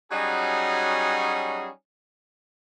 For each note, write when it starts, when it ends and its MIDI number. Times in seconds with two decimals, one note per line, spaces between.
0.11 1.68 54
0.11 1.68 55
0.11 1.68 61
0.11 1.68 63
0.11 1.68 66
0.11 1.68 68